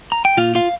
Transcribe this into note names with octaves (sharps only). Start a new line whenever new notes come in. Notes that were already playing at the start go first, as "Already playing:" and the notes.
A#5
G5
A#2 F4 F5
F4 F5